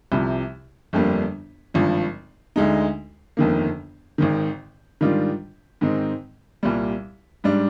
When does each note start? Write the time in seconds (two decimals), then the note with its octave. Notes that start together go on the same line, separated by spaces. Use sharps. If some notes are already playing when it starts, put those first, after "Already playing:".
0.12 C2 C3 F3
0.93 G1 F2 D3 G3 A#3
1.74 G#1 G2 F3
2.56 D2 D3 G#3 D#4
3.37 G1 F2 D#3 A#3
4.18 G#1 G#2 D#3
5.01 G#2 D#3 G3 D4 F4
5.81 G#2 D#3 G#3 C4 D#4
6.63 C2 A#2 G3
7.44 G#2 G3 D4